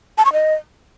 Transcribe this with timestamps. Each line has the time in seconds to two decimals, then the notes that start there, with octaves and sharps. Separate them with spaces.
0.18 A5
0.25 C#6
0.33 D#5